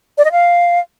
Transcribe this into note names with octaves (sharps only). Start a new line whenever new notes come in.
D5
D#5
F5